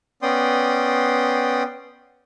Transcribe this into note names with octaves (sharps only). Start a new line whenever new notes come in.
B3 C#4 D5 G5 C6 D#6